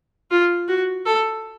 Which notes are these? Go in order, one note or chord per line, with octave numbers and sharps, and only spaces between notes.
F4
F#4
A4